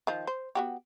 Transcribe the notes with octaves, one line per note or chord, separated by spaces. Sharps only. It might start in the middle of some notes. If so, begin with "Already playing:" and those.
D#3 F3
C5
B3 F#4 G4